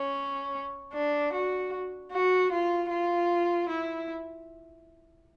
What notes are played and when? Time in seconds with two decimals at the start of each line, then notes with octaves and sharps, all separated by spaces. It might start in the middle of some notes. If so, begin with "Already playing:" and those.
Already playing: C#4
0.93 D4
1.33 F#4
2.12 F#4
2.52 F4
2.90 F4
3.69 E4